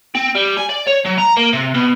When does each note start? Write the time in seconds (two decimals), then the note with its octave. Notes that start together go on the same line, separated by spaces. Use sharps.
0.15 C4
0.35 G3
0.57 G#5
0.69 D5
0.87 C#5
1.05 F#3
1.18 A#5
1.37 A#3
1.53 C3
1.75 B2